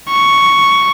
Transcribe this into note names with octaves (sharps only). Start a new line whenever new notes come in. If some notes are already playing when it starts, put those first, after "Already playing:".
C#6